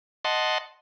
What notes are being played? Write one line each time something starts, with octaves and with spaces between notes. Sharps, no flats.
D#5 F#5 A5 C6